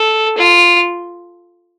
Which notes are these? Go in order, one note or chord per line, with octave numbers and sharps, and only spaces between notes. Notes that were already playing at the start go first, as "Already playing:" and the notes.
Already playing: A4
F4